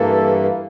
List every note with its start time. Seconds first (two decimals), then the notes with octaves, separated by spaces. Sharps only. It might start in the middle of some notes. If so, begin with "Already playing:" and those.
Already playing: G2 E3 A#3 A4